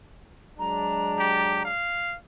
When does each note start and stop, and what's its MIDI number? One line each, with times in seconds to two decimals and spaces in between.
0.58 1.70 54
0.58 1.70 56
0.58 1.70 62
0.58 1.64 82
1.19 1.61 67
1.65 2.16 77